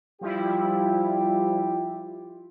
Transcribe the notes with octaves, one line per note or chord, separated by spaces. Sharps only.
F3 G3 E4 F4 G4